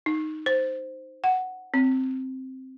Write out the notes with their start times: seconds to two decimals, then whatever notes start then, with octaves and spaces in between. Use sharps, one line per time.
0.06 D#4
0.46 C5
1.24 F#5
1.74 C4